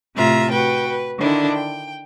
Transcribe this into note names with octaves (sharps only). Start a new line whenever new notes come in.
A2 C3 F4 E5 A#5
F#4 B4 G5
B4
D3 D#3 D4 E4
G5